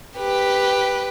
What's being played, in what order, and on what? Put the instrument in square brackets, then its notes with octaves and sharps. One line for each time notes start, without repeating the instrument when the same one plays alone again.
[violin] G4 B4